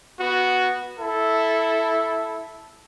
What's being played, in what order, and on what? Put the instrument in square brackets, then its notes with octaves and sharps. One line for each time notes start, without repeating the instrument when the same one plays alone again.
[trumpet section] B3 F#4
E4 A4